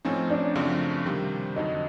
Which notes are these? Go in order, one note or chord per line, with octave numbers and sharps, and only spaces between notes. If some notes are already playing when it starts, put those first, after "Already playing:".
A2 F3 A3 C4 C#4 D#4
D4
F#2 C#3 F3 A3 C4
C3 D#3 G3
F2 D3 F#3 D#4